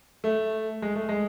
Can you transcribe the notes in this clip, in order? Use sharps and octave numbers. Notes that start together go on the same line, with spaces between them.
A3
G#3
A3
G#3